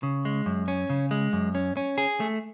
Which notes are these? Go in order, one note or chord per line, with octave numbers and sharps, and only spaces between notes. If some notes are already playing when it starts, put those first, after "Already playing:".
C#3
G#3
F#2
C#4
C#3
G#3
F#2
C#4
C#4
G#4
A3